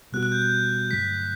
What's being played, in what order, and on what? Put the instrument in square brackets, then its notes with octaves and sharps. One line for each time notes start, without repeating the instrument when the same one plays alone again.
[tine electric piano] B2 G3 B3 F#4 [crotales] F#6
[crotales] F#6
G6
G6
[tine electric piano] G2 D3 F#3 A3 [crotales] B6